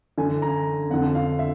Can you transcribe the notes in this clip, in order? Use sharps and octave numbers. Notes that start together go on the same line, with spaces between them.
F#2 D3 G#5
A#5
F2 D3 F#5
F5
E5